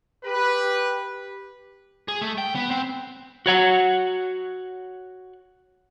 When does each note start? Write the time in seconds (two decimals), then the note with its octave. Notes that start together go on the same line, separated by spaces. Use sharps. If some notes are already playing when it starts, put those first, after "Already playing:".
0.25 G4 B4
2.08 G#4
2.22 A3
2.38 G5
2.55 B3
2.71 C4
3.46 F#4 C#5 F#5